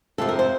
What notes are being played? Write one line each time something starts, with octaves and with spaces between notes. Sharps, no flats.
F2 C3 F3 A4
A#4
C5